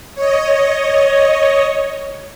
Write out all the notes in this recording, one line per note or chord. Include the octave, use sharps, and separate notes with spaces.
C#5 D#5